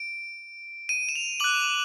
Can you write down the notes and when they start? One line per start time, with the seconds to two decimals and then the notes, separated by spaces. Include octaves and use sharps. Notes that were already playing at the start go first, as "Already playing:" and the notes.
Already playing: D7
0.89 D#7
1.09 E7
1.16 F7
1.40 D6 F#6 F#7